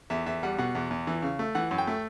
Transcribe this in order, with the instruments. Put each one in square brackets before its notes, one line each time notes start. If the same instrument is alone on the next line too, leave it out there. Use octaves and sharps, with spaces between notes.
[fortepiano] E2 E5
E2 E5
G3 F#5
B2 F#5
E2
E2
E3
C#3
A3
E3 F#5
F#2
G5
A3